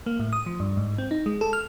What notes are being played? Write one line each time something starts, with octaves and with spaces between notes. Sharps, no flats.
A#3
A2
D#6
F3
G2
G#2
C4
D#4
G#3
A4
F6